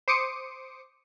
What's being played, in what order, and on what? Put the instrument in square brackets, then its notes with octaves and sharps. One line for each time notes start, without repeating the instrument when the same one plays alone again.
[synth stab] C5 D6 D#6 C#7